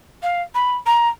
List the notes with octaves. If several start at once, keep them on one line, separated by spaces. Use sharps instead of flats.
F5
B5
A#5